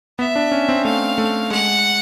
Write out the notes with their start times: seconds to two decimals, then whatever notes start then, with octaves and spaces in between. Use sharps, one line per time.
0.19 B3 E5
0.36 D4
0.52 C#4
0.69 C4
0.84 A3 F5
1.18 A3
1.51 G#3 F#5